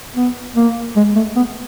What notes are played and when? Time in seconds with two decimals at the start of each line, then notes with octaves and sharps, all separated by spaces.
0.16 B3
0.56 A#3
0.96 G#3
1.16 A3
1.36 B3